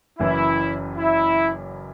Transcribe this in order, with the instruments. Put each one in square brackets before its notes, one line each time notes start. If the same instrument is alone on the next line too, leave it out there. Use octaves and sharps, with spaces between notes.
[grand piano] F#1 F#2 E3 [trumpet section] E4
[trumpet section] E4